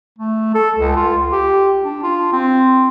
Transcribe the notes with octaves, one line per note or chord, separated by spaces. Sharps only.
A3
A4
C#2
F4
G4
D4
F4
C4